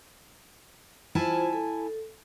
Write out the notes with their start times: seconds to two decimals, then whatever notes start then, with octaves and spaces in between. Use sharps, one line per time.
1.15 E4 F4 C5 G#5 A5
1.53 A4